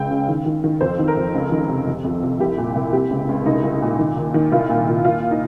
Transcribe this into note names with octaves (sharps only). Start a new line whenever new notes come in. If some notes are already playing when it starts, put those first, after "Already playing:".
Already playing: C#2 C#3 G5
C#3
D#3
D#3
D#3
F2 C5
D#3
A#4
F2
C#2
D#3
C3
F2
F2
C3
C2 G4
A#2
C2
C3 G4
C#2
C#2
C2 D#4
C2
A#2
D#3
D#2
D#3
C2 F4
A#2
A#2
D#2 F4
D#4